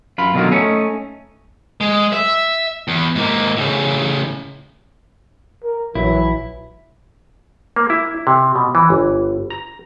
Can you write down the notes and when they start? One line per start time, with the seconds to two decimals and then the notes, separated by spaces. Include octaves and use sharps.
0.18 F#2 F4 B5
0.34 B2 D3 D#3 F#3 A#3 F4
0.51 A3 C#4 D#4
1.81 G#3
2.13 E5
2.88 E2
3.15 G#2 A#3
3.57 A2 C#3
5.63 A#4
5.95 A#1 E3 F#3 E4
7.76 A#3
7.90 E4
8.27 C3
8.56 B2
8.75 E3
8.90 G1
9.50 A#5